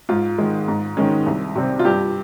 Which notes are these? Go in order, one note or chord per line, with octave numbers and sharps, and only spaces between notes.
G#2 F4
D#3 G#3
G#2
D#3 G#3 C#4
C2
C3 G3 C4
F4
G2 G4